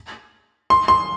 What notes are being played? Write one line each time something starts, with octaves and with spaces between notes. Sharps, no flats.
C6
C6